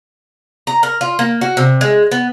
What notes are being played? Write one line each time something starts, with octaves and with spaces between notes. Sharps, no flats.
A#5
A#4
F4
A#3
F#4
C3
G#3
B3